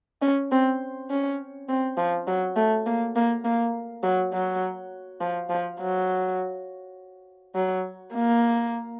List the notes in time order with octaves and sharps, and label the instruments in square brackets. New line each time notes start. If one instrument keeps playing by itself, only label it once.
[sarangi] C#4
C4
C#4
C4
F3
F#3
A3
A#3
A#3
A#3
F#3
F#3
F3
F3
F#3
F#3
A#3